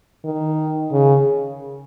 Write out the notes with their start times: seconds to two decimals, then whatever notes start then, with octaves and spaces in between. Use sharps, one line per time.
0.25 D#3
0.92 C#3